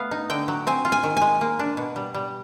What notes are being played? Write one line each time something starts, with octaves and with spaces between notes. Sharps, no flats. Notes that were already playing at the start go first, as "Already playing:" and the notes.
Already playing: A3 B3 F5
D#4
D3 G5
F#3
C4 G#5
F4
G#5
D#3
G#3 G#5
A#3
D4
B2
G3
G3